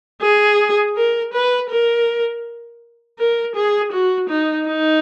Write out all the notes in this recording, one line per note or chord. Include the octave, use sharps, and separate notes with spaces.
G#4
A#4
B4
A#4
A#4
G#4
F#4
D#4
D#4